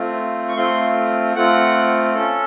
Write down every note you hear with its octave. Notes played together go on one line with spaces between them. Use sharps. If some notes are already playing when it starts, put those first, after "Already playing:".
Already playing: A3 C4 F4
C#6
A3 C4 F4 C6
A3 C4 F4 F#5
C#4 A4